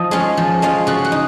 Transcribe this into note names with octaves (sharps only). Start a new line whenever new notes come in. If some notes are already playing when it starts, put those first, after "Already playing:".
Already playing: F3 D#5
G#3 C#4 F4
F3
G#3 C#4 F4
C#3 F#4
F#4
D#4